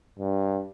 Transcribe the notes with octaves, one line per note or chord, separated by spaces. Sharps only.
G2